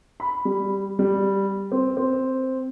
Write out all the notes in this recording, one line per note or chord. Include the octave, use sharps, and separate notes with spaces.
B5
G3
G3
C4
C4